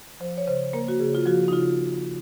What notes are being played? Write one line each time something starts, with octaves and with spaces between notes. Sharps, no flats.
F3 C5
C#5
C#3 C5
A#3 A#4
F#4
C#3 G#4
F4
F3 F#4
D#4
C#3 F4